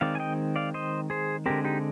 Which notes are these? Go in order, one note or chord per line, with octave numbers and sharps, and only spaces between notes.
D#3 G#3 C4 D5 F5
G#5
D#5 G5
D5 F5
C5 D#5
G#4 C5
D3 G#3 C4 G4 A#4
D#4 G4